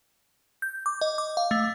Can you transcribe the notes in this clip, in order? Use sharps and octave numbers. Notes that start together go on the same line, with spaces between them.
G6
D6
D#5
D6
F5
A3